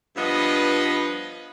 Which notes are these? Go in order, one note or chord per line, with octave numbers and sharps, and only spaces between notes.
G2 F3 B3 B4 D#5